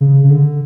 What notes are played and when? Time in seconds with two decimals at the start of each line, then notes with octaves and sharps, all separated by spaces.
0.01 C#3
0.24 C#3
0.30 D3